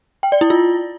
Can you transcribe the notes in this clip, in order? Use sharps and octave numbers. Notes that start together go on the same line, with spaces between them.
G5
D5
E4
F4